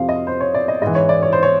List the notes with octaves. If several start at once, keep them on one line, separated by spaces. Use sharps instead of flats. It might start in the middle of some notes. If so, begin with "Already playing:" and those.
Already playing: F2 C3 F3 F5
D#5
C5
C#5
D5
D#5
G#2 E3 D#5
C#5
D5
C#5
C5
C#5